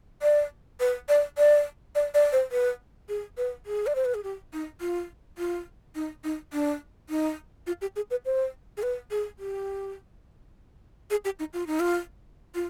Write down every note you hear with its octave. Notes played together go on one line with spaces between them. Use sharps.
D5
B4
D5
D5
D5
D5
C5
B4
G#4
B4
G#4
D5
C5
B4
G#4
G4
D#4
F4
F4
D#4
D#4
D4
D#4
F4
G4
G#4
B4
C5
G#4
B4
G#4
G4
G#4
G4
D#4
F4
D#4
F4
F4